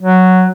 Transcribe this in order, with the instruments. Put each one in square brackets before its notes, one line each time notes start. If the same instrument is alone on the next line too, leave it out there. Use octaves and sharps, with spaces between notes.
[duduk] F#3